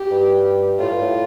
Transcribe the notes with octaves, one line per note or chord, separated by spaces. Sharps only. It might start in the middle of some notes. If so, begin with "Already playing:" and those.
Already playing: G4
G2
A2 F4
G2
A2